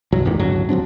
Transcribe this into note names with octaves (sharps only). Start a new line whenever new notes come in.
C2 G2 F#3
G1 E2 A2 D#3
D1 G1 C#2 F#3
D#1 F#3 C4 D4